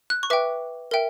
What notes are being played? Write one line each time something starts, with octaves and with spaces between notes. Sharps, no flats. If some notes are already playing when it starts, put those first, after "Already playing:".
F#6
C#6
B4 E5 G5 D6
A#4 E5 G5